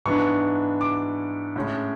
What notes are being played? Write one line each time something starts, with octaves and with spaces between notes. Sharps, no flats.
G#2 E3 B3 D4 C#6
D6
A2 G#3 C#4